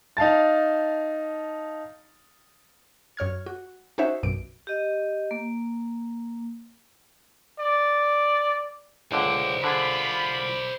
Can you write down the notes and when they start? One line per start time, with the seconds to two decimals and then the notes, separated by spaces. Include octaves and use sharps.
0.17 D#4 F5 A5 A6
3.17 F#2 C#5 F6 G#6
3.46 F#4
3.98 C#4 D#4 F#4 C5 C#5 E5
4.23 B1 F#2 B2 D7
4.67 G4 D#5
5.31 A#3
7.59 D5
9.12 C#2 D3 C5 D5
9.64 D3 F4 G#4 B5